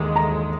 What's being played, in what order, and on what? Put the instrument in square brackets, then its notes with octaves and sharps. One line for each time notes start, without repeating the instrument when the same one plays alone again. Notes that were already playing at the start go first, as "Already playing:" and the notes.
Already playing: [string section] D#2 D#3 G#3 [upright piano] D6
[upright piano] A#5